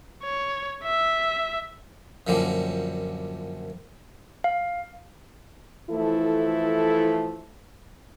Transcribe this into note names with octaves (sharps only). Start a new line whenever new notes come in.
C#5
E5
F#2 A#2 D3 F3 G3
F5
E3 F3 A3 E4 A4